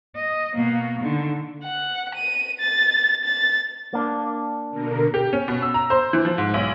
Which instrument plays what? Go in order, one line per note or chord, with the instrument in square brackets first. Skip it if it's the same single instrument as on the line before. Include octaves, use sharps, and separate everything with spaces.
[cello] D#5
B2 A#3
D3 D#3
[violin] F#5
D#7
A6
A6
[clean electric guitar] A#3 D4
[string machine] B2 D3 A#4
[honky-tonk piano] G4
C#4
B2
E6
A#5
C5
E3
F3
G#2
B1